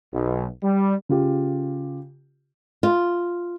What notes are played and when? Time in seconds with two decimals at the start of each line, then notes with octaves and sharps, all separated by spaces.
0.13 B1
0.63 G3
1.09 C#3 F4 G4
2.83 F4